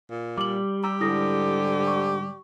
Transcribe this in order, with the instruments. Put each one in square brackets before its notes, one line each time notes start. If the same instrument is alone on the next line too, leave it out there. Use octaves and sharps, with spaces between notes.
[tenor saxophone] A#2
[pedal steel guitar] G3 [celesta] D6 F#7
[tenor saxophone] G4 [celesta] A#5 E6
[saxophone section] G#2 D3 [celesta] E4 D#6 A#6
[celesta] C#6